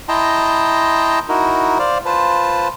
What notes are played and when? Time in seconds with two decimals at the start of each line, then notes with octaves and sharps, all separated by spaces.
0.09 E4 D#5 G5 A5 A#5 C6
1.29 D#4 E4 F#4 A#4
1.79 C5 D5 F5
2.06 F4 B4 C5 A5